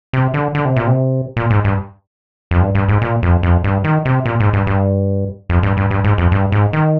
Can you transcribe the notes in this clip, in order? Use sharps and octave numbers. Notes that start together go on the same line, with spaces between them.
C3
D3
D3
C3
A#2
C3
A#2
G#2
G2
F2
G2
G2
G#2
A#2
F2
F2
G2
D#3
C3
A#2
G#2
G2
G2
F2
G2
G2
G2
G#2
F2
G2
G#2
D#3